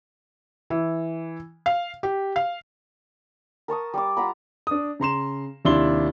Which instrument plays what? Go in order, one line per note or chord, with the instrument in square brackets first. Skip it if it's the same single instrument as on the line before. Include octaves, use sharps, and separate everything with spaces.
[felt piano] E3
F5
G4
F5
[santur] A#4 A5 C#6 D#6
G3 A5 D6
F4 F#5 A#5 B5
[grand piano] D4 D#6
C#3 A#5 C6 E7
D#2 C3 D4 E4 C6 G7